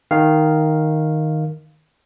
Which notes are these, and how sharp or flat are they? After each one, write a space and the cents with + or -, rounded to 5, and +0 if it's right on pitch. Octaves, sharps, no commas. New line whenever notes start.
D#3 +0 F5 +0